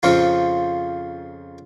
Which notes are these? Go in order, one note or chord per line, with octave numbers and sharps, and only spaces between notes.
F2 C#3 F3 F4